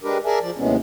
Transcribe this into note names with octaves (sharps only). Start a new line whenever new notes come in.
G#3 D4 G4 A#4 B4
G#4 A#4 D5 E5 G#5 A5
F3 D5
D#2 A2 C3 G#3 B3 C#4